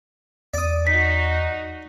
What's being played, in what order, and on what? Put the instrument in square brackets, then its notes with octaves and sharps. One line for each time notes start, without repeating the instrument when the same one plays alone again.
[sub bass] E2 [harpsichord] D5 D#6
[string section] D#4 F#4 [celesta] B6